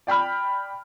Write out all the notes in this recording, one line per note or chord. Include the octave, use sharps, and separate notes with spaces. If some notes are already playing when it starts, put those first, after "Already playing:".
D5 G5 B5 F6